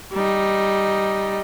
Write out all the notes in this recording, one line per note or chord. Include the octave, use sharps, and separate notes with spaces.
G3 D#4